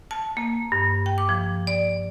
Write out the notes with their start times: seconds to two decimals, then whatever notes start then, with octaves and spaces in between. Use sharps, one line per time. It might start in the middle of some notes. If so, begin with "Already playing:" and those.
0.11 A5
0.37 A#3
0.72 G2
1.06 G5
1.18 D6
1.29 F3
1.67 D5